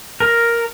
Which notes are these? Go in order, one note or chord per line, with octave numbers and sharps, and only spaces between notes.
A#4